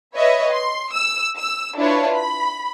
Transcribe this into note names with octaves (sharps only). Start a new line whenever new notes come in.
B4 C#5 D#5 E5
C6
E6
E6
D4 E4 F4 B4 C#5
B5